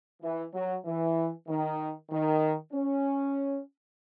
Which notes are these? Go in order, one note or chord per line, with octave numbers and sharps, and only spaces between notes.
E3
F#3
E3
D#3
D#3
C#4